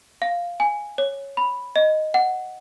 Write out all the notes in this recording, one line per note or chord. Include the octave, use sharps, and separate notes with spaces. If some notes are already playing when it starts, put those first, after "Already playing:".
F5
G#5
C#5
B5
D#5
F#5